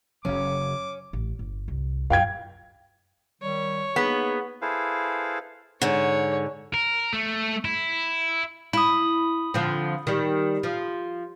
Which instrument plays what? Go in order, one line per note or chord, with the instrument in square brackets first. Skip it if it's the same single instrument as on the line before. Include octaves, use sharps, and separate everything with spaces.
[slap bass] F#1 C#3 F#3 [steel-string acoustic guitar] C#4 [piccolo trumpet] D6
[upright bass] A1
G1
C2
[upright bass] F#2 A#2 [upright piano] F5 G5 G#6
[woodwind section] D#3 G3 [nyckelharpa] C#5
[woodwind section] A#3 D#4 G#4 [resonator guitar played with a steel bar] B3
[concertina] E4 G#4 A4 B4 C5 F5
[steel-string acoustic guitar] G#2 D3 [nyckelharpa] C#5
[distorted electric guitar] A#4
A3
E4
[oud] E4 [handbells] B5 D#6
[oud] D3 F3 C4
D#3 G3
F3